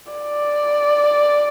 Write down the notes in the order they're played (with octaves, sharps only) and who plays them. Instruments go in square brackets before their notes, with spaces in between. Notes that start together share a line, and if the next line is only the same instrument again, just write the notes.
[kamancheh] D5